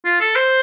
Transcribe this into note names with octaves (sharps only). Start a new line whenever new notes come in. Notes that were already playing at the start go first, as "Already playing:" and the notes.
F4
A4
C5